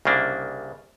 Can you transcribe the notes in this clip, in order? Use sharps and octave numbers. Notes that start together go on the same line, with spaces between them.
C2 C#3 A#3 D4